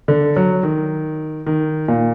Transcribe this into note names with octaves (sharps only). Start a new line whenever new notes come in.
D3
F#3
D#3
D#3
A#2